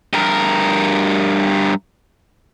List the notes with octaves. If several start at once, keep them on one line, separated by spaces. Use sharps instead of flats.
G2 A#4